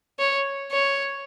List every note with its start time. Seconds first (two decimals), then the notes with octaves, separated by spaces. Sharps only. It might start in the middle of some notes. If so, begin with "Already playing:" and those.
0.19 C#5
0.71 C#5